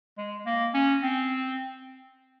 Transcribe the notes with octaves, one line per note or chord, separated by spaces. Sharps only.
G#3
A#3
C#4
C4